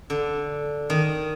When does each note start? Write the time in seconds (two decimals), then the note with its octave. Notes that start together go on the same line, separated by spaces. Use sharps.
0.10 D3
0.90 D#3